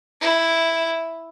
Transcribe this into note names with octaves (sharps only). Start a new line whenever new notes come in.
E4